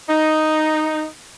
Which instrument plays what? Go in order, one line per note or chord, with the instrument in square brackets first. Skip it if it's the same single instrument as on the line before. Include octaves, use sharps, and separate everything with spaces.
[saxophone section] D#4